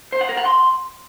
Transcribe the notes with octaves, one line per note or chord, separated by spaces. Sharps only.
C5
F#5
A#4
F#5
C6